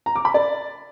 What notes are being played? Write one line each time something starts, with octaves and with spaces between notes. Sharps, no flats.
A#5
D6
B5
D5